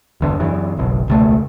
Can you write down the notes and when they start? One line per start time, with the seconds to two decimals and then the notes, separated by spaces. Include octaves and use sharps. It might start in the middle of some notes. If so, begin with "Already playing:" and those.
0.21 G1 E2 D3
0.40 F#2 E3
0.77 F#1 B1
1.08 E1 C#2 A3